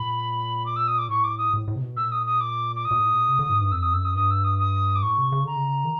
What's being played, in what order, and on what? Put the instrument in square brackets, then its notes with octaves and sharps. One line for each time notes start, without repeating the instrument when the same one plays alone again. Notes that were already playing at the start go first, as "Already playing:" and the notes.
Already playing: [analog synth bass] A#2 [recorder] B5
[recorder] D6
E6
D#6
D6
[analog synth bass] A2 [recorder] C#6
[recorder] D6
D#6
[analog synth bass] A2
A2
C3
B2
[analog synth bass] A#2 [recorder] E6
[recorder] D#6
D#6
D6
D6
D#6
[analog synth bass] A#2
A2
A#2
C3
D3
G#2
G2
[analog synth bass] F2 [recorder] E6
[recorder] D#6
[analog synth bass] F#2 [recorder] E6
[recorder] D#6
[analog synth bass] G2 [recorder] D#6
[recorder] E6
D#6
D#6
D6
[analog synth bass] A2 [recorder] C#6
[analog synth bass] C3
C#3
[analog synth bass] D3 [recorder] A#5
[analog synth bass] C#3
D#3